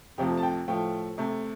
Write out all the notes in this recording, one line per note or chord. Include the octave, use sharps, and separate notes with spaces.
F2 C3 F3 A3 G4
A5
G5
A2 F3 A3 G5
C3 A3